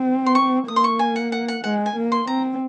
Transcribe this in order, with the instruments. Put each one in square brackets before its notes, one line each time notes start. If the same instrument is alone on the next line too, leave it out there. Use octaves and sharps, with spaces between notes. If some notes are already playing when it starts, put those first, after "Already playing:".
Already playing: [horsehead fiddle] C4
[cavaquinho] C6
C#6
[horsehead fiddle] A#3 [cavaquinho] D#6
[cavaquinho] C6
C#6
G#5
F#5
F#5
F#5
[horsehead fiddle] G#3 [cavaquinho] F#5
[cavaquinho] G#5
[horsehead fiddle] A#3
[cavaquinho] C6
[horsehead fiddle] C4 [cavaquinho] A#5